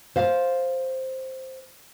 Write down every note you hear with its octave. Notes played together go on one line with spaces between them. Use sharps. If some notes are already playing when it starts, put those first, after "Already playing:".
C5 F5